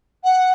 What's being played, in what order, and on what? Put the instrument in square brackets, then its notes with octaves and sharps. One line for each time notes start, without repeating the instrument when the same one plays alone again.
[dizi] F#5